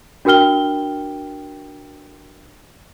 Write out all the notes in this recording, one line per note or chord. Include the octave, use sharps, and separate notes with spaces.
D4 F#4 A#4 G5 F6 G7